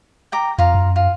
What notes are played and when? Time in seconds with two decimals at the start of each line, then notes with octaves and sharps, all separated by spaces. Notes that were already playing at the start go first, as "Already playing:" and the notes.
0.32 G5 A#5 D6
0.58 F2 F4 A#5
0.74 F#2
0.96 F4